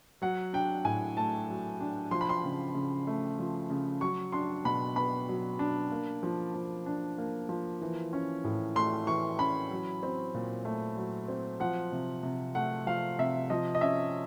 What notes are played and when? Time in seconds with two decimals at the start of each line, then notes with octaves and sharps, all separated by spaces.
0.22 F#3 F#5
0.53 D4 G5
0.85 A2 G#5
1.17 A3 A5
1.49 F#3
1.80 D4
2.11 F3 C6
2.21 B5
2.29 C6
2.43 C#3
2.74 C#3
3.07 A3
3.39 F3
3.70 C#3
4.01 F#3 C#6
4.32 D4 C6
4.64 B2 B5
4.96 B3 B5
5.29 F#3
5.59 D4
5.92 A#3
6.23 F3
6.54 F3
6.86 D4
7.18 A#3
7.49 F3
7.81 E3
8.13 C#4
8.44 A2
8.75 A3 C6
9.07 E3 C#6
9.38 C#4 B5
9.71 F#3
10.03 C4
10.34 A#2
10.65 A3
10.97 F#3
11.28 C4
11.60 F3 F#5
11.92 C3
12.23 C3
12.55 A3 F#5
12.87 F3 F5
13.19 C3 E5
13.50 F3 D#5
13.75 D#5
13.81 C#4 E5